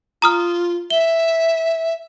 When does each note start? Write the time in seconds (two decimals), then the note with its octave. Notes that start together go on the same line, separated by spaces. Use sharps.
0.22 F4 A#5 D#6 F6
0.90 E5 G7